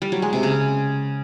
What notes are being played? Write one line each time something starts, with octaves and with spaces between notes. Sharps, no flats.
G3
F#3
G#3
C3
C#3